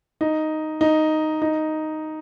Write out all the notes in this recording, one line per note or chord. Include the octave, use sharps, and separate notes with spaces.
D#4
D#4
D#4